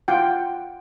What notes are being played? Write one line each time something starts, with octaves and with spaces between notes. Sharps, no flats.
F4 F#5 G5